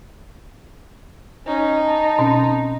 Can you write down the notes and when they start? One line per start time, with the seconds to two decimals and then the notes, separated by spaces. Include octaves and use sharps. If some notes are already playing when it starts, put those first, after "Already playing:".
1.47 C#4 D#4
1.86 A5
2.19 B2 C4 C#4